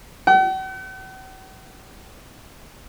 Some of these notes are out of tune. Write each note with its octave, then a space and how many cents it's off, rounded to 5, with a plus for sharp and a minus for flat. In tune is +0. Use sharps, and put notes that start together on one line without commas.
F#5 +45